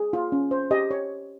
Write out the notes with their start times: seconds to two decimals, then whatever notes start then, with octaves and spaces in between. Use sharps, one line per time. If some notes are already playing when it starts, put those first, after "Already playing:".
Already playing: G#4
0.13 F4
0.32 C#4
0.51 C5
0.71 G4 D#5
0.91 C#5